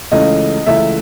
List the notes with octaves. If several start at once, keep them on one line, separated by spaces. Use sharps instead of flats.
C#2 C#3 E3 A3 D#5
C#2 C#3 E3 A3 E5